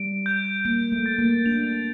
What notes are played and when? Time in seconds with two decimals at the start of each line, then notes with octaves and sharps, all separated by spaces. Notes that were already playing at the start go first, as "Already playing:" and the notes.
Already playing: G3 D7
0.26 G6
0.65 A#3 D7
0.92 A3
1.06 A6
1.19 A#3
1.46 D4 F7